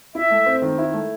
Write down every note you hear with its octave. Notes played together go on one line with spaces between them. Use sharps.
E4 E5
A3
C4
D#3
E4
A3